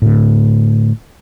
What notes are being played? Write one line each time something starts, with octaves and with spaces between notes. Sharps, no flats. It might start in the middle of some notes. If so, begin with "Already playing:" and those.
A2 D3